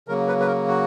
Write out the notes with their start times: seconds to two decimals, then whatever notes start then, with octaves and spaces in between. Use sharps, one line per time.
0.08 C#3 F#3 A#3 A#4
0.28 B4
0.40 B4
0.47 A#4
0.68 F#4